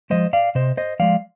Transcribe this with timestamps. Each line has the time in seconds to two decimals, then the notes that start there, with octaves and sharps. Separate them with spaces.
0.10 F3 G#3 C5 D#5
0.33 D5 F5
0.55 C3 C5 D#5
0.77 C5 D#5
0.99 F3 G#3 D5 F5